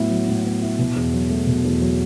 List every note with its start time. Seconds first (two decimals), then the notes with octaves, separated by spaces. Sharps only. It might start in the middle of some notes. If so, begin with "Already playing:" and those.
Already playing: A2 F#3 B3 E4
0.11 F#3
0.28 A2
0.45 B3
0.62 E4
0.79 B2
0.96 E2
1.13 F#3
1.30 A3
1.47 B2
1.64 E2
1.81 F#3